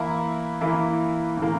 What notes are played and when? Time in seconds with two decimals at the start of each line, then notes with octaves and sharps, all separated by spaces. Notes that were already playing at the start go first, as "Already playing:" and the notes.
Already playing: E3 A#3 E4
0.61 E3 A#3 E4
1.37 A2 E3 A#3